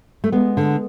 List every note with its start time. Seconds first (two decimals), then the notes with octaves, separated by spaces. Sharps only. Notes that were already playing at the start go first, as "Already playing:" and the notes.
0.24 A3
0.32 G#3 B3
0.57 D3